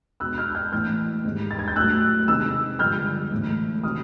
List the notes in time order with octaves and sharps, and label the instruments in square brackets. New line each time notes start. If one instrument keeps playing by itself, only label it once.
[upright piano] B2 G#3 E6 F#6
F6 G6
F6 G6
A2 E3 A3 F6 G6
G#2 D#3 G3
A6
G#6
G6
A2 F#3 A3 E6 F#6
C3 D#3 G#3 E6 F#6
G2 D3 F3 G#3 F6 G6
A2 E3 G#3
C3 D#3 F#3 D#6 F6